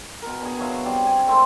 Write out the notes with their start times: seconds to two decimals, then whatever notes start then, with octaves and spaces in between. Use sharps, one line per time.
0.22 B2 A#4
0.42 D4 G#4
0.59 B2 F#3 E5 F5
0.85 G3 C4 F4 D5
1.06 G#5
1.28 G#3 A3 C4 A#4